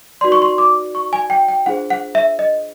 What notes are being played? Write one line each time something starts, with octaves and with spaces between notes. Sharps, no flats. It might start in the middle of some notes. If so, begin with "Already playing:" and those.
D#4 F#4 B4 D5 C6
C#6
C6
D6
C#6
G#5
G5
G5
D4 F4 G#4 C5 F#5
F#5
E5
D#5